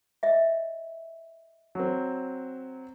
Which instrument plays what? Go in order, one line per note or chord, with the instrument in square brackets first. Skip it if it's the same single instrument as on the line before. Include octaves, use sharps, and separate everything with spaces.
[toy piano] D#5 E5
[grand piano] F#3 C4